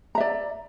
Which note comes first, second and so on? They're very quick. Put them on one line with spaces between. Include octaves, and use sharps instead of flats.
A#5 E5 D5